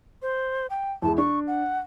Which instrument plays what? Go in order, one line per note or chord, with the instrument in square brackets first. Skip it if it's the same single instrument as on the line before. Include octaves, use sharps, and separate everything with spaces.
[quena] C5
G5
[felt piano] E2 E3 G#3 [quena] A5
[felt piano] D4 [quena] C#6
[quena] F#5